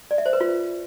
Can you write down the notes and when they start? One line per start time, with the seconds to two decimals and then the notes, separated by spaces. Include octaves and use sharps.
0.11 D5
0.18 E5
0.26 C5
0.33 B4
0.41 F4